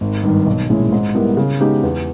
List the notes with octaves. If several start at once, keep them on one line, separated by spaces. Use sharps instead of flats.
G#1
G2 D#3
B1
A#2 G#3 C#4 E4
G#2
G3 B3 E4 A#4
C#3
G#3 B3 D#4 G4
E2